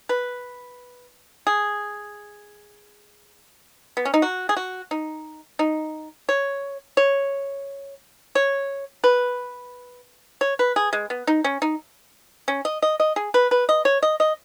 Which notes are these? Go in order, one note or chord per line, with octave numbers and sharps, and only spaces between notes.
B4
G#4
B3
C#4
D#4
F#4
G#4
F#4
D#4
D#4
C#5
C#5
C#5
B4
C#5
B4
G#4
G#3
B3
D#4
C#4
D#4
C#4
D#5
D#5
D#5
G#4
B4
B4
D#5
C#5
D#5
D#5